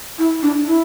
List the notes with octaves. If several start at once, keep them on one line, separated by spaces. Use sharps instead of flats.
E4
D4
E4